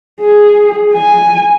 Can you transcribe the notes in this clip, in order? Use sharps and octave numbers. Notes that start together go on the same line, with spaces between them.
G#4
G#5